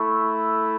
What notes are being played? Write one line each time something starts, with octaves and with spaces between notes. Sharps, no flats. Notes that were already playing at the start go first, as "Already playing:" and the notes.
Already playing: A3 E4 C#6